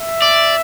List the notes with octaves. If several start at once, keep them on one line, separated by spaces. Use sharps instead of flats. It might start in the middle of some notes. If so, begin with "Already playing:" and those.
Already playing: E5
D5